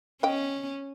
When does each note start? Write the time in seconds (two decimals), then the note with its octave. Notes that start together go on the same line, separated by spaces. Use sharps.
0.23 C#4 D#5 G5